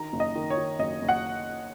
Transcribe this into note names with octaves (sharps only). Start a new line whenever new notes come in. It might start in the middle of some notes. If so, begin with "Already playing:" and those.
Already playing: D#3 A#5
F#1
D#5
D#3
C#5
D#3
F#1 D#5
F#1
F#5